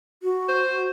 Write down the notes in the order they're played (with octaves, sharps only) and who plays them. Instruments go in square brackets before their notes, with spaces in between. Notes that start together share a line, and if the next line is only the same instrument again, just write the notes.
[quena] F#4
[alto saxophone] C5